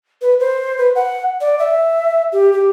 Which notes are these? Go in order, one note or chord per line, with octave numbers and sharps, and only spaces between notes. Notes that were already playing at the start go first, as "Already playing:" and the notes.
B4
C5
B4
F#5
D5
E5
G4
G4